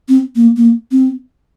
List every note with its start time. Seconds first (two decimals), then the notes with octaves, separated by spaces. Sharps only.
0.09 C4
0.36 A#3
0.57 A#3
0.92 C4